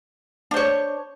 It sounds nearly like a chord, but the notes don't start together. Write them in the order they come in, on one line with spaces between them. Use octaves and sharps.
D4 C5 C#5